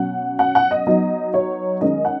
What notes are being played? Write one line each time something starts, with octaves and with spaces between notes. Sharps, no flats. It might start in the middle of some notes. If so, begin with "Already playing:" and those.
Already playing: B2 F#3 C#4 F#5
F#5
F#5
D#5
F#3 B3 D#4
C#5
D#3 G#3 C#4 D#5
F#5